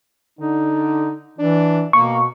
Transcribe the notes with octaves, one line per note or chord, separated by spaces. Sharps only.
D3 D#4
E3 D4
B2 A#3 C#6